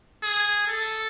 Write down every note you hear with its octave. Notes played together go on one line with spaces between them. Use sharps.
G#4
A4